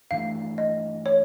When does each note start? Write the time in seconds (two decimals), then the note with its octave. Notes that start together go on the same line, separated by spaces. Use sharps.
0.11 G2 E3 A3 F5
0.58 D#5
1.06 C#5